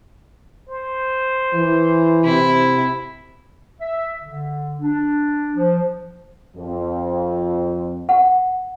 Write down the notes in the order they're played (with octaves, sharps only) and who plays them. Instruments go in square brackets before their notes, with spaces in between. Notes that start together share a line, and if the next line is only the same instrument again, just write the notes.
[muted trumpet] C5
[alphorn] E3
[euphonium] C3 [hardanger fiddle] E4
[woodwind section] E5
D3
D4
F3
[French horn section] F2
[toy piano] F#5